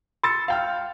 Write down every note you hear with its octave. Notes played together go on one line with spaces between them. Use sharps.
C6 E6 A6 C#7
F5 G5 F6